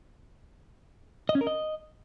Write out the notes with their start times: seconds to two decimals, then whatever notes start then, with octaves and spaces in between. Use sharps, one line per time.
1.29 D#5
1.35 C#4
1.41 A#4
1.47 D#5